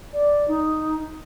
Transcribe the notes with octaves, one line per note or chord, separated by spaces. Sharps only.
D5
D#4